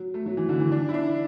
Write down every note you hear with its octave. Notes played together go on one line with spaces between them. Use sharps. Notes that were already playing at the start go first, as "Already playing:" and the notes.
Already playing: F#3
A3
F#3
E3
D3
E3
D4
E4
D4